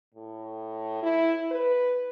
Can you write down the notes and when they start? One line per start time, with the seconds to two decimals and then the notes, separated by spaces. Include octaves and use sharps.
0.14 A2
1.03 E4
1.51 B4